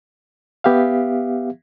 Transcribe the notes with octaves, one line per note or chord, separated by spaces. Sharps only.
B3 G4 E5 F5